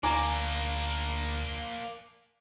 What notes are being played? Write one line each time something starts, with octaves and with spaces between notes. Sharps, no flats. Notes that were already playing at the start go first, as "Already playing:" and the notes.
D2 A#3 D4 G#5 A#5 D6